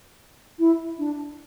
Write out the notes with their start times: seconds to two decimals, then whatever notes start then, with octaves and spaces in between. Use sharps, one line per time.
0.59 E4
0.99 D4